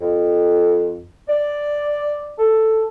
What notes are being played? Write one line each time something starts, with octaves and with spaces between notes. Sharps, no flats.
F2
D5
A4